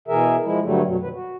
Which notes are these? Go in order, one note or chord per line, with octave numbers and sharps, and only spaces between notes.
B2 E3 G#4 A#4 E5
F3 G#3 E4
G2 D3 F#3 G3 A3
F#2 B2 F#3
B2 D#3 F3 B4
F#4